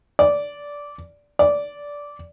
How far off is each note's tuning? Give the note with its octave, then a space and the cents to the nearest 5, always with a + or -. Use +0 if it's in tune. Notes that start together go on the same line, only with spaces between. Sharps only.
D5 -15
D5 -15